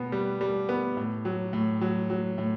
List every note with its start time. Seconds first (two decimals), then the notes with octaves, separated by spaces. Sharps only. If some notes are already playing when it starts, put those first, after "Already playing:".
Already playing: B2 B3
0.12 G3
0.41 G3
0.69 B3
0.97 A2
1.25 F#3
1.53 A2
1.81 F#3
2.10 F#3
2.38 A2